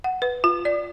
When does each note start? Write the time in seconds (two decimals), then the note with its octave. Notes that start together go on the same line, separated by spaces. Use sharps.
0.04 F#5
0.22 B4
0.44 F4
0.65 D5